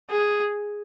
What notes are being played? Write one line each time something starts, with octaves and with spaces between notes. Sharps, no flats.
G#4